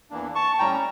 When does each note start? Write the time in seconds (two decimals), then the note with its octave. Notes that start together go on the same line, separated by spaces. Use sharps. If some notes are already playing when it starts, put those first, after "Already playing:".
0.10 E2 E3 A#3 D4
0.35 A5 C#6
0.59 A2 G3 C#4 G5 A#5